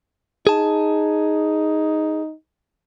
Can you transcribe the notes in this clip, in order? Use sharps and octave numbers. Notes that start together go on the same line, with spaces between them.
D#4 G#4 A5